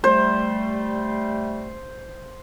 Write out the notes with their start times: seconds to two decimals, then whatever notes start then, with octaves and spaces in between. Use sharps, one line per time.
0.04 G3 A3 C5